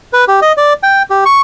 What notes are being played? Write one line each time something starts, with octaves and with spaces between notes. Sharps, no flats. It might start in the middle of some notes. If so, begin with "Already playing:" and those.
B4
G4
D#5
D5
G5
G4
C#6